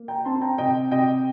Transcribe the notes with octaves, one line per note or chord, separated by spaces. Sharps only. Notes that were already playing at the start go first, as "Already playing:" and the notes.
Already playing: A#3
G5 A#5
C4 A5 C6
G5 A#5
C3 D#5 G5
C3 D#5 G5